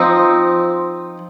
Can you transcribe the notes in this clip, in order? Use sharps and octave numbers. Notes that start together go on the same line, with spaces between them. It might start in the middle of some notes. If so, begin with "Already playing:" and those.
Already playing: F3 C4 D#4